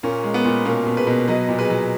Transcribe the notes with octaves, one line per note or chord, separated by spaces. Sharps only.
A#2 A#3 C#4
G#3
B3
A#2
B2 A#3 C#4
B2
G#4 B4
B2
F#3 B4 D#5
A#2
G#4 B4
F#3